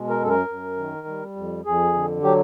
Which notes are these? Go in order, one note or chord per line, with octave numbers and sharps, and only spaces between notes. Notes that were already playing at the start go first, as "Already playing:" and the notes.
Already playing: B2 G#3
A#4
F#2 A4
A#4
F#2
D#3
G3
F2
F2 G#4
D3
F#3 G4